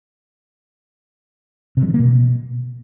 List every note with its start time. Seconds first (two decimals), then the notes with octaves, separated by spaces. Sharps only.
1.77 C3
1.83 F#3
1.88 D#3
1.94 A#3
2.00 B2